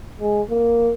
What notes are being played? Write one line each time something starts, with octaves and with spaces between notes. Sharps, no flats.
G#3
A#3